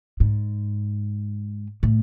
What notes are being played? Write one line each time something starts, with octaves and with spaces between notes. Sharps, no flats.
G#2
A2